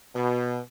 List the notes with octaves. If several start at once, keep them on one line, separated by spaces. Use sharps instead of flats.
B2